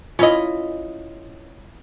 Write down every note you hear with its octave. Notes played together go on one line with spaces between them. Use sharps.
C#4 E4 F4 D#5